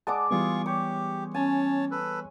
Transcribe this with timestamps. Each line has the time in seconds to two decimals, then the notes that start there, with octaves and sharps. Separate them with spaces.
0.07 G#3 D5 F#5 A5 D6
0.31 E3 G3 B3 F4 G#4 C#6
0.66 G4 C#5
1.34 C#4 C#5 G#5 A5
1.91 A4 B4